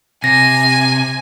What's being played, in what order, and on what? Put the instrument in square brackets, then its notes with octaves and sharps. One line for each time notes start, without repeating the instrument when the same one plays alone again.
[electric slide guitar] C3 [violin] G#5 [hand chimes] A#6